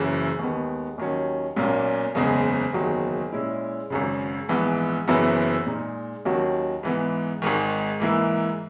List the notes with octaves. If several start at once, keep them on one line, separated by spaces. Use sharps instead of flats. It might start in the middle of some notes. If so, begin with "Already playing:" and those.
Already playing: F#1 F#2 C#3 E3
D#2 D#3 G#3 B3
D#2 D#3 F#3 C#4
B1 A#2 A#3 C#4
F#1 E2 C#3 G#3
F#1 E2 D#3 F#3
A#2 G#3 C#4 E4
G#1 F#2 C#3
A#1 G#2 E3 B3
F#1 F#2 E3 B3 E4
A#2 G#3 D#4
D#2 D#3 F#3 C#4 F#4
G#2 E3 B3
G#1 G#2 D#3
G#2 E3 A#3 E4